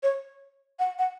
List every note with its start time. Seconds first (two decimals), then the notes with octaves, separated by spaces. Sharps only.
0.03 C#5
0.79 F#5
0.99 F#5